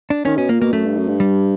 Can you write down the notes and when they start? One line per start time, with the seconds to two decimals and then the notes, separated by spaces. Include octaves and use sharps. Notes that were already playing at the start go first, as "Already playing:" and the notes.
0.10 D4
0.25 D#3 C#4
0.37 B2 C#4
0.49 A#2 A#3
0.61 B2 A#3
0.72 F#2 A3
0.85 G2
0.97 F#2
1.08 G2
1.20 G3